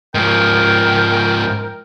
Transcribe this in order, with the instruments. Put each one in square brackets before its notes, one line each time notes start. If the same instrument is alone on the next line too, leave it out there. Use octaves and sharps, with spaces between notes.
[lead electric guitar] G#2 F3 [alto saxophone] A#4 [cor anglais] G5